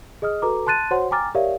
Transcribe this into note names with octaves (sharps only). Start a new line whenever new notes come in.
G#4 D#5 D#6 F6
F#4 A4 B4 A#5 D6
A5 C6 F#6 A6 D#7
F#4 C5 C#5 F#5 C6
G5 G#5 A#5 D6 F6 A6
G4 A#4 C#5 D5 E5 F5